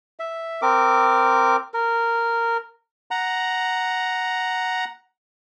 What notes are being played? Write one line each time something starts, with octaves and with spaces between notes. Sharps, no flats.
E5
C4 A#4 D6
A#4
F#5 A#5